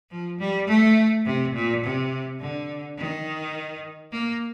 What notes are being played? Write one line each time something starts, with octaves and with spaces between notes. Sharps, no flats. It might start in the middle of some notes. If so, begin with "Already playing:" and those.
F3
G3
A3
C3
A#2
C3
D3
D#3
A#3